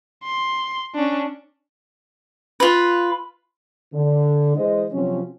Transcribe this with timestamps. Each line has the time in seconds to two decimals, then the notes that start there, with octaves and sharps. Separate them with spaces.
0.24 C6
0.95 C#4 D4
2.60 F4 B4
3.94 D3
4.56 E3 G#3 C5 D#5
4.92 C3 F3 F#3 C4 C#4